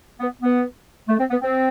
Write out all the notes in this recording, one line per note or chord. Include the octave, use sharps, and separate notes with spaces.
B3
B3
A3
C4
B3
C4